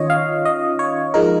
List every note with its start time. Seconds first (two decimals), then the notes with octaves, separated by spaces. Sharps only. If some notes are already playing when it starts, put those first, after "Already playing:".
Already playing: D#3 C#4 F4 C#5 D#5
0.10 F5
0.45 D#5
0.79 C#5
1.14 F3 G#3 D#4 A#4